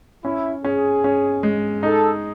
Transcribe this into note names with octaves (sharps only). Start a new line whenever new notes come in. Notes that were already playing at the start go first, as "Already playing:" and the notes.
C#4 E4
C#4 G#4
C#4
G#3
D#4 A4